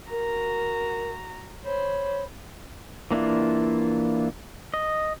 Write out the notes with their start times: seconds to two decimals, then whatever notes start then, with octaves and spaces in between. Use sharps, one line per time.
0.11 F#4 A#4 A#5
1.65 C5 C#5 B5
3.11 E3 A#3 D4 E4 F4
4.74 D#5